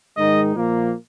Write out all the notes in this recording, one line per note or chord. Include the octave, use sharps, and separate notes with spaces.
G#2 D#3 G#3 D#4 D#5
A#2 F3 A#3